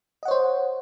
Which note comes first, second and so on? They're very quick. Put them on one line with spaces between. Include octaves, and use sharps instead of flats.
D#5 F#5 C#5 C5